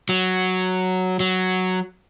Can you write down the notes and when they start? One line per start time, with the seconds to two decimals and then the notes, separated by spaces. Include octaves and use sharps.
0.09 F#3
1.20 F#3